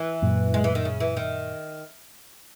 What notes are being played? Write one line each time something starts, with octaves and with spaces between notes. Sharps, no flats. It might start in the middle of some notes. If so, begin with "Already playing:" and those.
Already playing: E3
F#2 A#2
G#3
E3
D#3
C#3
E3
D#3